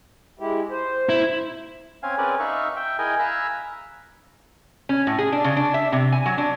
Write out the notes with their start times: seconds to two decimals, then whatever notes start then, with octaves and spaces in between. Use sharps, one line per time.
0.39 G#3 E4 G4
0.71 C5
1.09 E4
2.03 C4 C#4 F5 G#5
2.18 C4 C#4 G#4 A#4 B4 D5
2.40 D#4 E5 F5 C#6
2.76 E5 G5
2.99 E4 G#4 A#4 D#5 G5 G#5
3.19 F5 G#5 A#5 B5 E6 F#6
4.89 C#4
5.07 A2
5.19 G#4
5.32 D4
5.44 C#3
5.57 D4
5.74 E5
5.92 C3
6.12 G#5
6.26 F#3
6.38 D4